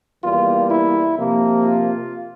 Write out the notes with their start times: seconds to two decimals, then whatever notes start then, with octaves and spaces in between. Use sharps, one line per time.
0.24 E2 E3 G3 A#3 F4
0.71 E4
1.17 C3 F3 A#3
1.63 F4